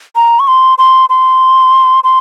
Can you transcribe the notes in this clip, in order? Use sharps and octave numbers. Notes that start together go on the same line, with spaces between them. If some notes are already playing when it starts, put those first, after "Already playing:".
A#5
C#6
C6
C6
C6
C6